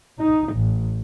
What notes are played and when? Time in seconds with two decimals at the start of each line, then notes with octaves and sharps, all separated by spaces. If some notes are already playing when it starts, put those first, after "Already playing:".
0.19 D#4
0.54 A1